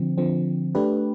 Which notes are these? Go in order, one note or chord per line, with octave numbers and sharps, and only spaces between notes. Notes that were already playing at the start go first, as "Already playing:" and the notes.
Already playing: D3 F3 C4
D3 F3 C4
A3 D4 G4 B4